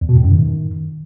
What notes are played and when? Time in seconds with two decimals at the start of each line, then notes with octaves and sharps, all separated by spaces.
0.01 E2
0.09 B2
0.16 A2
0.24 F#2
0.32 D#3